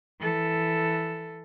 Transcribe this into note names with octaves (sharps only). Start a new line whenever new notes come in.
E3 A4